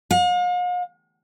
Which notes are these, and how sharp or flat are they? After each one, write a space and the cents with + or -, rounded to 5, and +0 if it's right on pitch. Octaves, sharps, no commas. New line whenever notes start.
F5 +45